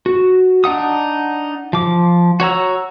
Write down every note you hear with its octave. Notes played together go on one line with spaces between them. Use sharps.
F#4
D4 D#4 F#5 D#6
F3 D6
F#4 C#5 A#5 E6